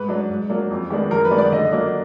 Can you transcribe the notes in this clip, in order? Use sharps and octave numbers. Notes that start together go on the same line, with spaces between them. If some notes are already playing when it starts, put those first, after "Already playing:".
Already playing: G#2 B4
F#3 D4
G#2
F#3 A#3 D4
F2
D#3 G#3 B3 D4
F#2 A#4
B4
D#3 G#3 B3 D4
D5
D3 D#5
F#3 A#3 D4